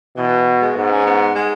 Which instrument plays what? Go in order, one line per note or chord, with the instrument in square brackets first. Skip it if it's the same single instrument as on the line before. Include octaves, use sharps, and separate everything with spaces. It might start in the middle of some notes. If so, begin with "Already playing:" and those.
[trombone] B2 [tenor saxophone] E3
[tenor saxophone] G#3
[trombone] G#2 [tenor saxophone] B3
[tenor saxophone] C#4
B3
G#3